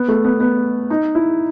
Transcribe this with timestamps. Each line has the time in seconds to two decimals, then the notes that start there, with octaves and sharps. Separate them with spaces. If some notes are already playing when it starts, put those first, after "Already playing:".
Already playing: B3
0.08 A3
0.24 B3
0.40 B3
0.90 D#4
1.15 E4